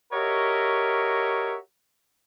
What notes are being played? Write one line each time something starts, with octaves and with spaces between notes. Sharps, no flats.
F#4 G4 A#4 C#5 D#5 E5